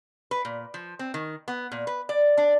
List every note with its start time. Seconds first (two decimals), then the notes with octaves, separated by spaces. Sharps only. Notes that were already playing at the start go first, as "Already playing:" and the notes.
0.31 B4
0.45 A#2
0.74 F3
0.99 C4
1.14 D#3
1.48 B3
1.72 A#2
1.87 B4
2.09 D5
2.37 D4